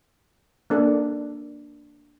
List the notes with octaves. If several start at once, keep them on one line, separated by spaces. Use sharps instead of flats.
A#3 D4 A4